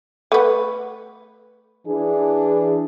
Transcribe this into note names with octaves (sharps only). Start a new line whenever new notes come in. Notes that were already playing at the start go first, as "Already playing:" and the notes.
A3 B3
E3 D4 G#4